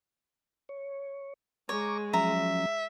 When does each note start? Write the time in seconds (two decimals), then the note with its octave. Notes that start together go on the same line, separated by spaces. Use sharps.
0.69 C#5
1.69 G#3 C#5 A#5 C#6 D6
2.13 F3 F#3 C#4 E5 A#5